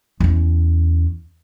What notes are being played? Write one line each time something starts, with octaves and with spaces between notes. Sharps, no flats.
E2 C#4